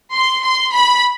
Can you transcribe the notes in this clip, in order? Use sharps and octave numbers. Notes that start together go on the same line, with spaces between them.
C6
C6
B5